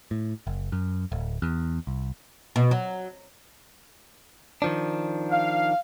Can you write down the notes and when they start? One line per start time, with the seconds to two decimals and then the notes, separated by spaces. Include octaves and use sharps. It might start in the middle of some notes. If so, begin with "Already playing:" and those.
0.11 A2
0.47 F#1
0.72 F#2
1.12 D1
1.42 E2
1.87 C2
2.56 B2
2.71 F#3
4.62 D#3 F3 D4
5.30 F5